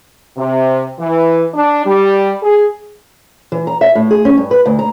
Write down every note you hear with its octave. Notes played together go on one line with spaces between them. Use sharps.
C3
E3
D4
G3
G#4
E3
A#5
E5
A2
G#4
C#4
G2
B4
D2
A#5